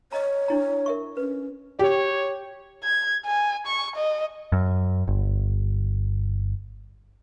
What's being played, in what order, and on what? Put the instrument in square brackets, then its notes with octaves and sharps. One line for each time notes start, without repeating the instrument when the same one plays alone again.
[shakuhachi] C#5 [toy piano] D#5 A#5
[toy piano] D4 E4 A#5
A#4 E5 C#6
[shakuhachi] C#4 [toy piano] B4
[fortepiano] G4 [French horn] C#5
[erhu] G#6
G#5
C#6
D#5
[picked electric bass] F#2
G1